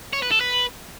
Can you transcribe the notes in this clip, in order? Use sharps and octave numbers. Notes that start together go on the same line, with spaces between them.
C#5
B4
A4
B4